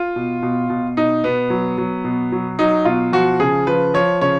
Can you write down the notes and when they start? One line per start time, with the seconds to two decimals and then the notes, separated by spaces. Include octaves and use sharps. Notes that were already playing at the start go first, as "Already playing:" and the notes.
Already playing: F4
0.16 B2
0.43 B2
0.70 B2
0.97 B2 D#4
1.24 B2 B3
1.50 F#3
1.78 F#3
2.04 B2
2.32 F#3
2.59 F#3 D#4
2.85 B2 F4
3.13 F3 F#4
3.40 C#3 G#4
3.67 F3 B4
3.94 F3 C#5
4.21 C#3 C#5